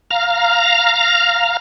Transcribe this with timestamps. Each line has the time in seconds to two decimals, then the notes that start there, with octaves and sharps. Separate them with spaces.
0.11 F5 A#5 F6